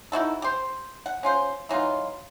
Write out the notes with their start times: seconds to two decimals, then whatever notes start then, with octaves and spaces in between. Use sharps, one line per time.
0.12 D#4 E4 F#4 A4
0.42 G4 C5
1.06 F#5
1.23 C#4 F4 C5
1.69 E3 F#3 D#4 F4